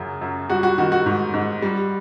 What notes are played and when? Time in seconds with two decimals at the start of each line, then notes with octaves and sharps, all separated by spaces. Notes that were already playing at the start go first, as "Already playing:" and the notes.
Already playing: F#2 C#3
0.21 F#2
0.50 G3 F#4
0.63 F#4
0.78 D#3 F#4
0.92 F#4
1.06 G#2
1.34 G#2
1.62 G3